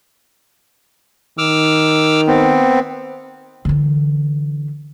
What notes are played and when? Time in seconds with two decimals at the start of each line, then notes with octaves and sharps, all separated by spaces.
1.38 D#3 D6 E6 F6
2.27 B3 C4
3.65 D3 E3